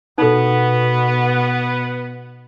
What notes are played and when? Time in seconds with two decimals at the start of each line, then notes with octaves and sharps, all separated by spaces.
0.18 B2 B3 D#4 A4